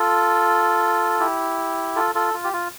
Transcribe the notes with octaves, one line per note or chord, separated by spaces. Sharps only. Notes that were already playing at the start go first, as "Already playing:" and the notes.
Already playing: F4 A4
E4 G4
F4 A4
F4 A4
F4
G4
F4